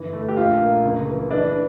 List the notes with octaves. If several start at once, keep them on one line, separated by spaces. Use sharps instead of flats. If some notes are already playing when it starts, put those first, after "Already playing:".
Already playing: G1 E3
A3
G4
A#1 F4
A#3
C#2
E3
E3 D4